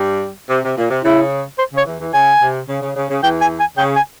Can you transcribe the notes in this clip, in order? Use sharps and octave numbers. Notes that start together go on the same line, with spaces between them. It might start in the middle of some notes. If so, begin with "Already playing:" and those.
Already playing: G2 G3
C3
C3
A#2
C3
C#3 E4
C5
C#3 C#5
E2 E3
E2 E3
C#3 G#5
C3
C#3
C#3
C#3
C#3
E2 E3 G5
G#5
G#5
C#3 G5
G#5